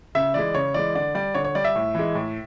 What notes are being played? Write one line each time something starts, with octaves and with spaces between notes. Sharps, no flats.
C#3 E5
E3 G#3 D5
C#3 C#5
E3 G#3 D5
D3 D5
G3 D5
D3 C#5
C#5
G3 D5
E5
A2
E3 G#3
A2